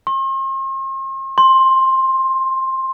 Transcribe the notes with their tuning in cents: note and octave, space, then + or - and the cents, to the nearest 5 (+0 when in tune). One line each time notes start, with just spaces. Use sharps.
C6 +45
C6 +15